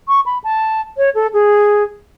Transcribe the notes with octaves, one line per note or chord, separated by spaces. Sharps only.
C#6
B5
A5
C#5
A4
G#4